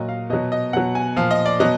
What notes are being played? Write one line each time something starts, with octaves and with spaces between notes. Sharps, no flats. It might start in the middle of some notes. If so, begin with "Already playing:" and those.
Already playing: A#2 F#3 D#5
F5
B2 F#3 D#5
D#5
B2 F#3 F#5
G#5
A#2 F3 F5
D#5
D5
B2 F#3 D#5